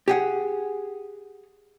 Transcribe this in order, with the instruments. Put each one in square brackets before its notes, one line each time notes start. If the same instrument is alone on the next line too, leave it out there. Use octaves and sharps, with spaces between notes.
[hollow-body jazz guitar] G4 G#4 F#5